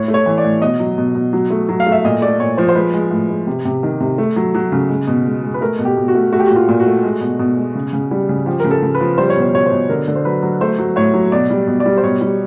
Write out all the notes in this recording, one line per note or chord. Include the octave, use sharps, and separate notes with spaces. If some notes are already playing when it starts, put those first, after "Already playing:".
Already playing: A2 C#5
A3
C#5
E3
D5
A2
B2 D#5
F#3
B2
B2
F#3
A3
F#3
F5
A3
E5
A#2 D#5
A3 D5
A#2 C#5
F3 C5
C5
G#3 B4
G#3
A2
G#3
C3
C3
D#3
C3
A3
F#3
F#3
C#3
G#3
B2
G#3
G#3
B4
A3 A#4
B2
G4
B2
F#4
A3
A3 F#4
G4
F#4
A#2
F4
A#2
F#4
A3
G#3
B2
B2
G#3
C#3
C#3
G3
C#3
F3 G4
C#3 A#4
A4
C#3
B4
F3
G3 C5
C#5
B2
C5
B2 C#5
C5
B2
D3 A#4
D3
C5
F#3 B4
F#3
A3 C5
F#3
A2 C#5
F#3
B2 D5
G3
B2
D5
G3
C5
B2 C#5
G3